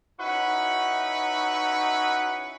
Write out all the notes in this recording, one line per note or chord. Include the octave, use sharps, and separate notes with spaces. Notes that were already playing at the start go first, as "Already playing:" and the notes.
C#4 D#4 E4 F#4 B4